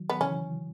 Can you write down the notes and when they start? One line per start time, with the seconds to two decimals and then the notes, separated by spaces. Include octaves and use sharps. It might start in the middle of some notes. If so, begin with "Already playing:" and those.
Already playing: D#3 F#3
0.09 B3
0.21 C#3 E3 C#4